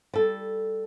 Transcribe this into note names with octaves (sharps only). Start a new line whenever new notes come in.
G3 A4